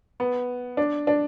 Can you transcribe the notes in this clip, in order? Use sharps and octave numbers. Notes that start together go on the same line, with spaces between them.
B3
D4
D4